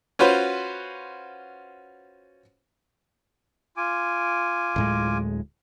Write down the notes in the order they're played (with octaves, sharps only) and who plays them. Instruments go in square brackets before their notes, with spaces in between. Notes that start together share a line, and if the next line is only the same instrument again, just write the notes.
[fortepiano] C#4 F4 F#4 B4 C5
[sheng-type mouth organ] F4 G#5 D6
[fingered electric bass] D1 A2 G#3